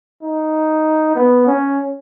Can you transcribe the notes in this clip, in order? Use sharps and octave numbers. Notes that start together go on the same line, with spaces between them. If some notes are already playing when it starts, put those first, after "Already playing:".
D#4
B3
C#4